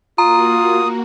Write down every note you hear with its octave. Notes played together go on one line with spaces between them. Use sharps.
A#3 F4 F#4 A#5 D#6